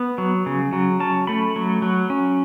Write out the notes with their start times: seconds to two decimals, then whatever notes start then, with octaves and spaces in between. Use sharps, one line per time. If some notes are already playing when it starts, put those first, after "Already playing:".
Already playing: B3
0.18 F#3
0.46 C#3
0.73 F#3
1.00 C#4 A5
1.27 A3 B5
1.56 F#3
1.82 F#3
2.10 C#4